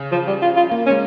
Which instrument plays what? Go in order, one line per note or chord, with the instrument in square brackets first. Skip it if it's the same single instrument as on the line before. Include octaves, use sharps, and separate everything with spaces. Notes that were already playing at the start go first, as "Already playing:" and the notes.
Already playing: [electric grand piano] C#3
[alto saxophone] F3
G3
F4
F4
[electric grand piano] A#3
[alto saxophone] C#4
[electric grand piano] G#3